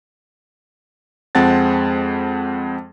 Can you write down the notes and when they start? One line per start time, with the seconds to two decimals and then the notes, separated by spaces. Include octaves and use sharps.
1.35 F2 G#3 C4 F#5 A5 A6